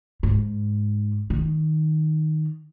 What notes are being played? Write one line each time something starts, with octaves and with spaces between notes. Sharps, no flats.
G#2
D#3